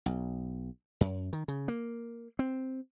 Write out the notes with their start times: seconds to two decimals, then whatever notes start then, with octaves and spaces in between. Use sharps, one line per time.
0.06 B1
1.01 F#2
1.33 D#3
1.48 C#3
1.68 A#3
2.39 C4